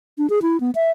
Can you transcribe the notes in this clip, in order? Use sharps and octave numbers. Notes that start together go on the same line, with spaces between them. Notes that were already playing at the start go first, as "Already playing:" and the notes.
D4
G#4
E4
B3
E5